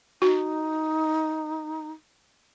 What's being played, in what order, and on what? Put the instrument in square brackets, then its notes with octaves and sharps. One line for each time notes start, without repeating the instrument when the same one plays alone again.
[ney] D#4 [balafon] F#4